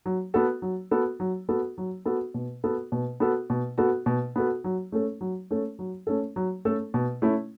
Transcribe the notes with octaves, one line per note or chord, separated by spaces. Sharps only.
F#3
B3 F#4 A4
F#3
B3 F#4 A4
F#3
B3 F#4 A4
F#3
B3 F#4 A4
B2
B3 F#4 A4
B2
B3 F#4 A4
B2
B3 F#4 A4
B2
B3 F#4 A4
F#3
A3 C#4 A4
F#3
A3 C#4 A4
F#3
A3 C#4 A4
F#3
A3 C#4 A4
B2
A3 C#4 E4